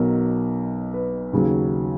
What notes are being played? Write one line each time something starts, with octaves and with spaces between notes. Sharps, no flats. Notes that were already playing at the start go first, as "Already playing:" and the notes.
Already playing: B1 B2 F#3 A#4
B4
D#2 C#3 F#3